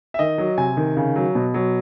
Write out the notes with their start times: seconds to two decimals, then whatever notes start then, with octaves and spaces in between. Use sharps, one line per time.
0.14 E5
0.19 D#3 D#5
0.38 F#3
0.58 C3 G#5
0.77 D#3
0.97 C#3
1.16 F#3
1.35 B2
1.54 F#3